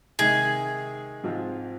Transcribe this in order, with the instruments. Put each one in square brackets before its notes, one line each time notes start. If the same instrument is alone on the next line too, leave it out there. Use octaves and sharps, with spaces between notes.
[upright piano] C3 D#3 G#3 [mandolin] G#4
[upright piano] G#2 F3 C4 F4